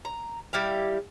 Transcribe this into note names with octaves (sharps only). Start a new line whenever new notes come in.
A#5
G3 E4 G4 F5